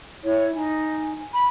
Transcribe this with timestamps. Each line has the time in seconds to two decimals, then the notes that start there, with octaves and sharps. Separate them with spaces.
0.24 E4 C#5
0.55 D#4 G#5
1.34 B5